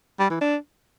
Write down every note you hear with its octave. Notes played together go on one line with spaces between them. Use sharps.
G3
E3
D4